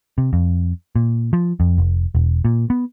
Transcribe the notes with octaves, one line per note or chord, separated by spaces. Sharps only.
C3
F2
A#2
F3
F2
F1
E1
A#2
B3